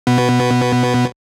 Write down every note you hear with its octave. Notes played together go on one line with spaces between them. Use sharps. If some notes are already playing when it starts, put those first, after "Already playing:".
B2 B3